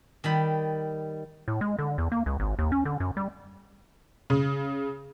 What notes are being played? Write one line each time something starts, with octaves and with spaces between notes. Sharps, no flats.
D#3 G3 B5
A2
G#3
D3
E2
A#3
C#2
G#1
D#2
C#4
D3
F#2
G3
C#3